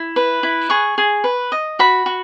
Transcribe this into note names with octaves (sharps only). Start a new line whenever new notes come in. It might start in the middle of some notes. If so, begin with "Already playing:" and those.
Already playing: E4
B4
E4
G#4 C#6
G#4
B4
D#5
F#4 B5
F#4